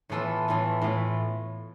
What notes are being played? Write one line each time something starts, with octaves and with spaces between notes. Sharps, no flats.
A2 E3 B3 F4 A4
A2 E3 B3 F4 A4
A2 E3 F4